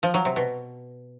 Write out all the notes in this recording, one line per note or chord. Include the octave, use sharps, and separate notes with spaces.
F3
F#3
C3
B2